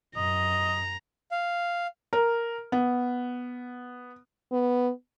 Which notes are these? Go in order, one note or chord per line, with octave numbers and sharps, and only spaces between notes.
F#2 D#5 A#5
F5
A#4
B3
B3